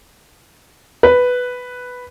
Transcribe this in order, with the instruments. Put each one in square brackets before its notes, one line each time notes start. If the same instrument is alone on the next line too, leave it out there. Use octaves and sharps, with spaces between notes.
[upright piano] B4